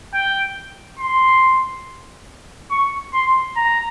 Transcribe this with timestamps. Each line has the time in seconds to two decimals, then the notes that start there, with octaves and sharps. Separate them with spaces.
0.14 G5
0.99 C6
2.71 C#6
3.14 C6
3.57 A#5